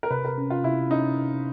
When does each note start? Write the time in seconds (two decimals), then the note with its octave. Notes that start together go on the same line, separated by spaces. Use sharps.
0.03 A#4
0.11 C3 B4
0.25 A#4
0.38 C#4
0.50 F4
0.64 C3 E4
0.90 C#4 D#4